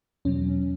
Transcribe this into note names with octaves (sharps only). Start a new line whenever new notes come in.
E2 B2 F#3 C#4